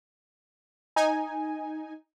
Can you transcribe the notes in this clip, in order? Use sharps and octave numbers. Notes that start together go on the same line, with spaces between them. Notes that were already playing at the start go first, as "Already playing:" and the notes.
D#4 G#5